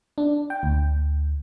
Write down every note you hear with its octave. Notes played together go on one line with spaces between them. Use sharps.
D4
G5
D2